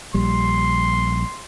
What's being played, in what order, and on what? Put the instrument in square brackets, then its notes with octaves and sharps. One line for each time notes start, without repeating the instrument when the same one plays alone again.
[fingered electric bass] A#1 G3 [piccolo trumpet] C6